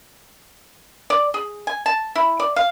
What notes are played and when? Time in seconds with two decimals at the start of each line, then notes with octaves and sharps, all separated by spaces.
1.10 D5
1.34 G#4
1.67 G#5
1.86 A5
2.15 E4
2.40 D5
2.56 F5